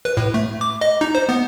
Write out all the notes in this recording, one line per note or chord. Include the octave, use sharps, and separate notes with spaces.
B4
A2
A3
D6
D#5
D#4
C5
B3